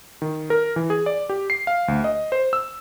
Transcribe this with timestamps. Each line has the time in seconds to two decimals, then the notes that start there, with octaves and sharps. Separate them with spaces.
0.22 D#3
0.50 A#4
0.76 E3
0.90 G#4
1.06 D5
1.29 G4
1.50 C7
1.67 F5
1.88 D2
2.04 D#5
2.32 C5
2.53 E6